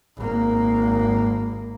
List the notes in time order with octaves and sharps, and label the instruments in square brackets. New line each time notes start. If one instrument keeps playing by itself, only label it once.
[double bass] G#1 A#3